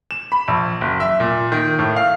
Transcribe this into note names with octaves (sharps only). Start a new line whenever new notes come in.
E7
B5
A#1
F#1
E5
A#2
D#3
A2
F5